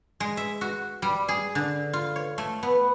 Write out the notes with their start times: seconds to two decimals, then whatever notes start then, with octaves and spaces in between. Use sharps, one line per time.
0.20 G#3
0.37 E5
0.61 F#4
1.02 G3
1.28 G#4
1.55 D3
1.93 F4
2.16 C#5
2.38 A3
2.63 B3